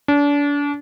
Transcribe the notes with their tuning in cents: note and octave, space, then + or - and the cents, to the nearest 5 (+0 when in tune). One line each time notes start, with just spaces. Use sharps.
D4 -35